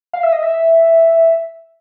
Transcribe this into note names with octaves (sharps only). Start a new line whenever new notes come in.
F5
E5
D#5
E5